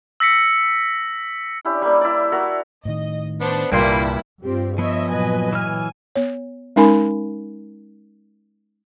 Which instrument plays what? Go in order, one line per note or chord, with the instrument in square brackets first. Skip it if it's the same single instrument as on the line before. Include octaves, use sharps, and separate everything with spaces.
[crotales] E6 A#6 B6 C#7
[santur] C#4 D4 E4 G4
G3 A#3
E4 D5
F#4 A#4 A5
[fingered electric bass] A2 D#3 [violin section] D#5
[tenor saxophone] B3 [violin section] D4 C5 D5
[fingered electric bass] C2 [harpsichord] G2 A#2 C6 [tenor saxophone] A#3 [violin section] E4 A5
[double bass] G2 [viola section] C4 F4 G4
[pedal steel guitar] F3 B3 [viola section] C#5 D#5 E5
[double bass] A#2 F#3 [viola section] B4 D#5 G#5
[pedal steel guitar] E3 C#5 F6 [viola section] G#5
[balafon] B3 C#5
G#3 C#4 D#4 A#4 G#5 B5